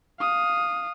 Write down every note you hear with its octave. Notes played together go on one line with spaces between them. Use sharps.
F5 D#6